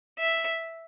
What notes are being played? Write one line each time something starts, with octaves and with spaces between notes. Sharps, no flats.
E5